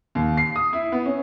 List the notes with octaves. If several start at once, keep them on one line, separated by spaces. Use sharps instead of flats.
D#2
C7
D#6
E4
B3
C#4